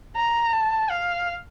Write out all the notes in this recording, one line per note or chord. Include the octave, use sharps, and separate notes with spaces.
A#5
A5
F5